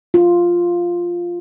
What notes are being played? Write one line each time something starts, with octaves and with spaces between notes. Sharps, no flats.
F4